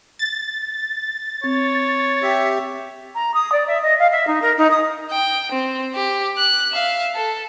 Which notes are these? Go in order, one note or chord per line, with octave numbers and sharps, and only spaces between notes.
A6
C4 C#5
G4 E5
A#5
D#6
D5
E5
D#5
F5
E5
D#4
A#4
D#4
D#6
G5
C4
G4
F#6
E5 F5
A4